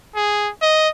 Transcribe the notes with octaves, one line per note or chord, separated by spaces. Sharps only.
G#4
D#5